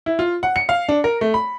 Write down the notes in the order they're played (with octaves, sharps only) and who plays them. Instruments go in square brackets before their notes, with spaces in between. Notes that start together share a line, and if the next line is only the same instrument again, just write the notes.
[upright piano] E4
F4
F#5
C#7
F5
D4
A#4
A3
B5